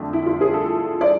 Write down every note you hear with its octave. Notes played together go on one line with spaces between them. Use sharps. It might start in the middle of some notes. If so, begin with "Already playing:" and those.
Already playing: F2 D3 A3
E4
F4
G#4
A4
D5